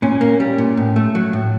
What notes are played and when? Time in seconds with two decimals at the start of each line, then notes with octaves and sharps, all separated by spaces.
0.02 A#2 C#4
0.21 A#3
0.40 G3
0.58 A#2
0.77 A2
0.96 A3
1.15 F#3
1.33 A2